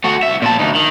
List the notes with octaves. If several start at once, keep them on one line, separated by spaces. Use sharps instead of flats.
A3 F#4
C2 E5
A#2 A5
D2 D#4
D#3